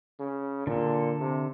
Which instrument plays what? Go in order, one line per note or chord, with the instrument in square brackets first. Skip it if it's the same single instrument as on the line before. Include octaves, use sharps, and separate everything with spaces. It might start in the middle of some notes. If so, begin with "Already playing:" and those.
[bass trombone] C#3
[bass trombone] A#2 [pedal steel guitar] D3 A4
[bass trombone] C3